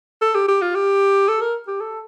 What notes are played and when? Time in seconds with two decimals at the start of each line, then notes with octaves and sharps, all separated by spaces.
0.21 A4
0.35 G4
0.48 G4
0.62 F4
0.75 G4
1.28 A4
1.41 A#4
1.68 G4
1.81 A4